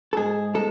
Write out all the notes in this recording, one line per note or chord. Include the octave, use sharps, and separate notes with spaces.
A4
G#2 G#4
G#3 A4